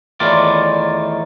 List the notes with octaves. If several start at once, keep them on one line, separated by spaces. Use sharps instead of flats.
E2 A2 D#3 F4 D5